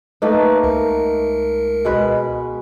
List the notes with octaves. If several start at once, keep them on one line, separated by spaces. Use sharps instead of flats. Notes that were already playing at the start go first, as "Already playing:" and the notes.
A3 A#3 D#4 B4
C#2 A#4
B2 G#3 B4